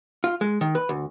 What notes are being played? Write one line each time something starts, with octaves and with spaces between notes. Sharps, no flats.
F4
G#3
D#3
B4
D2